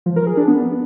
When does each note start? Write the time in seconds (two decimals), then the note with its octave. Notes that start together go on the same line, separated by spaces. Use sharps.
0.06 F3
0.16 A#4
0.27 G#4
0.37 D4
0.48 B3